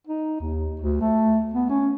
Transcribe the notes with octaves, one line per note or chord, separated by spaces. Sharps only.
D#4
D#2
D2
A3
B3
C#4